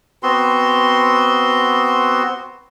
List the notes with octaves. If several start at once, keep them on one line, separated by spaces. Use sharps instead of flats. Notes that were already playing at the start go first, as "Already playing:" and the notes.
B3 C4 F#4 C6